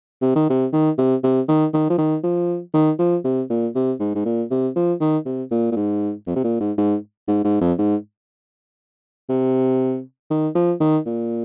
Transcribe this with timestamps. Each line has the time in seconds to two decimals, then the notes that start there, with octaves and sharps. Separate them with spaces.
0.22 C3
0.35 D#3
0.50 C3
0.73 D#3
0.98 C3
1.23 C3
1.48 D#3
1.74 D#3
1.90 F3
1.98 D#3
2.24 F3
2.74 D#3
2.99 F3
3.24 C3
3.50 A#2
3.75 C3
4.00 G#2
4.15 G#2
4.25 A#2
4.51 C3
4.76 F3
5.00 D#3
5.26 C3
5.51 A#2
5.72 A#2
5.76 G#2
6.27 F2
6.36 C3
6.44 A#2
6.60 G#2
6.78 G#2
7.28 G#2
7.44 G#2
7.61 F2
7.78 G#2
9.29 C3
10.31 D#3
10.55 F3
10.80 D#3
11.06 A#2